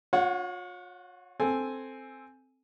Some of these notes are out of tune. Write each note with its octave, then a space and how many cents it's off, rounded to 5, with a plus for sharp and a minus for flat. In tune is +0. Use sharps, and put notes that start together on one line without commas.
F4 +45 C#5 +0 F#5 +0
C4 +0 A4 +0 G#5 +0